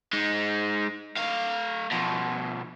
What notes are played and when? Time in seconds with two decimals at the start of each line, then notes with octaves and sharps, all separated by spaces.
0.13 G#3 D#4
1.17 A3 F5
1.92 B2 F3